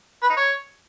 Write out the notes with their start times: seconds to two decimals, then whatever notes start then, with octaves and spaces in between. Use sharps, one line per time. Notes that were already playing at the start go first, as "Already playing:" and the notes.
0.22 B4
0.30 D#4
0.37 C#5